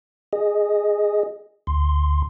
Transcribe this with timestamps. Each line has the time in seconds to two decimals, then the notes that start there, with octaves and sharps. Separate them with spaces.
0.33 G#4 D#5
1.67 D2 C6